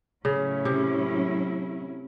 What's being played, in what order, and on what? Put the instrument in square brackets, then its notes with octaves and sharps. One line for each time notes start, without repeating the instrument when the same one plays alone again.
[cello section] A2 F#3 C#4 E4 [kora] C#3
[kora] C3